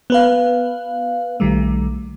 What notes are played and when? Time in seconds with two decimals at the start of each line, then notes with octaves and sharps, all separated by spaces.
0.10 B3 B4 F5
1.40 B1 D#3 G3 A3